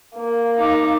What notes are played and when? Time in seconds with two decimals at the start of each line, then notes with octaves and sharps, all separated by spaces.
0.15 A#3
0.56 D#4 D6